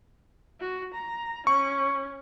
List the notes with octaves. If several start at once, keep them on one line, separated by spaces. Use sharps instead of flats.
F#4
A#5
C#4 C#6